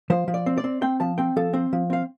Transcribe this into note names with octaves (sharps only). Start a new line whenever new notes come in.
F3 C5
F3
D5
C4
D5
C4
C4 G5
F3 A5
C4 G5
F3 A4
C4 C5
F3
C4 F5